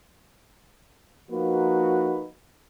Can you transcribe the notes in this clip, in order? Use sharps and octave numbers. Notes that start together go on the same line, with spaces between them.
F3 A#3 D#4 F#4 B4